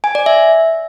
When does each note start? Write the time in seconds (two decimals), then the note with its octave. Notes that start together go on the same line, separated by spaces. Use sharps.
0.04 G#5
0.15 D5
0.26 E5